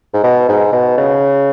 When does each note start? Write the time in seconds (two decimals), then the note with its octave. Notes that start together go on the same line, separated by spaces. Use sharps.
0.13 G#2
0.24 B2
0.49 G#2
0.73 B2
0.97 C#3